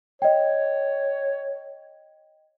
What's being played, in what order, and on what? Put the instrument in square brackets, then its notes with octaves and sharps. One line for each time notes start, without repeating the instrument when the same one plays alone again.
[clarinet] C#5 [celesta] D#5 G5